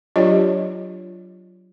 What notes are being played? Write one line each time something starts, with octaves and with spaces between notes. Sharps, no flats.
F#3 D4 F4 G4 C#5 D#5